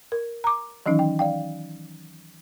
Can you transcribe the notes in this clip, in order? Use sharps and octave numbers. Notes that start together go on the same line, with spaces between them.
A#4
A#5 D6
D#3 E3 F#3 C#4 D#4
G5
D5 F5 G5